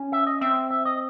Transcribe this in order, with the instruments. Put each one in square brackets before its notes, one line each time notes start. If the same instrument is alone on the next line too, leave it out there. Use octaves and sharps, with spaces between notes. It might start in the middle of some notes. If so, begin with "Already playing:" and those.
Already playing: [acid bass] C#4
[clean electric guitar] E5
D#5
[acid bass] C4 [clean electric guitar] E5
[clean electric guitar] E5
D#5